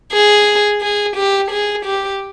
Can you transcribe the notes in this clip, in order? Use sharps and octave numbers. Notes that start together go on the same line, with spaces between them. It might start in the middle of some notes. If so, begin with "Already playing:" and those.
G#4
G#4
G4
G#4
G4